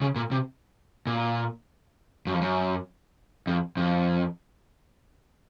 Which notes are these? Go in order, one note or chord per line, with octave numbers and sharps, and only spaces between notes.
C#3
A#2
C3
A#2
F#2
F2
F#2
F2
F2